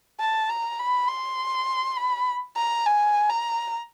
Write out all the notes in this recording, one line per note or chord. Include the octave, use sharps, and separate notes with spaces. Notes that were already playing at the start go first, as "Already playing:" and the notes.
A5
A#5
B5
C6
B5
A#5
G#5
A#5